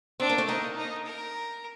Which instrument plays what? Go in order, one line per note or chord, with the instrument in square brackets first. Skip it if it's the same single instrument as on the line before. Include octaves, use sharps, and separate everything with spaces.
[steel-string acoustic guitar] C4 [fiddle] D4
[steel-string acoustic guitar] A#3
A3
[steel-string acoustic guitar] A#3 [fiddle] D#4
[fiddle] D#4
A#4